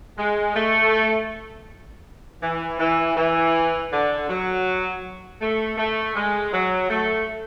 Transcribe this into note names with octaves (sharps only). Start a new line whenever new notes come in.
G#3
A3
E3
E3
E3
D3
F#3
A3
A3
G#3
F#3
A3